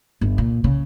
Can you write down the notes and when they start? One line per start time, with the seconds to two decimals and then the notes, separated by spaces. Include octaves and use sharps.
0.21 G1
0.38 A#2
0.64 C#3